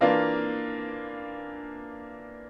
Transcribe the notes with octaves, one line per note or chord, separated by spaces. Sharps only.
E3 A#3 D4 F4